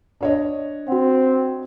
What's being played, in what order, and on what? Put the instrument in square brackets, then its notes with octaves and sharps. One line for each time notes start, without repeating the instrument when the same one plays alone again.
[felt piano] D4 C#5 D#5
[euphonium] C4 [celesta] F#4 F#5